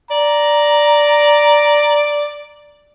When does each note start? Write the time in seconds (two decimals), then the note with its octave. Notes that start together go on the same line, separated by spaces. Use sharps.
0.11 D5 A#5